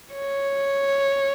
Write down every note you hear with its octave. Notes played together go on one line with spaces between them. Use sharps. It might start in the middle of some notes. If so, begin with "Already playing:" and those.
C#5